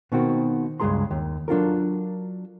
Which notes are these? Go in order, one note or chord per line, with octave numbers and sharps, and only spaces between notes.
B2 D#3 A#3 C4 F#4
C#2 G2 G#3 G#4 A#5 C6
D#2
F#3 D4 F4 A4 A#4